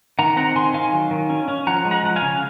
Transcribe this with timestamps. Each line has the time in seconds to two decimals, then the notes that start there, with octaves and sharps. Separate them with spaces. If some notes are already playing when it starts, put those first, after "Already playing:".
0.19 D#3 F#5 A#5
0.37 C4 F#5 A#5
0.56 D#3 G#5 C6
0.73 D#3 F5 G#5
0.93 F#3
1.11 D#3
1.30 C#4
1.48 C#4
1.67 F3 F#5 A#5
1.85 G#3
1.91 F#5 A#5
2.03 F3 F#5
2.16 F5 G#5
2.22 C#3